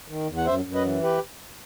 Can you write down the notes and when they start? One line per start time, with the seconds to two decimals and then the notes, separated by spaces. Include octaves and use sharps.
0.08 D#3
0.28 E2
0.37 F#5
0.46 F#2 C5 E5
0.65 F#2
0.74 B4 D#5
0.84 E3
1.02 G4 B4